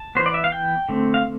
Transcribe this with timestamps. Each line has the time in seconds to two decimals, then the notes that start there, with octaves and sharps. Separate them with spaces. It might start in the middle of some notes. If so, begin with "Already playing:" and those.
Already playing: A5
0.15 E3 B3 C5
0.26 D5
0.34 E5
0.44 F5
0.52 G5
0.89 D3 A3 C4
1.14 F5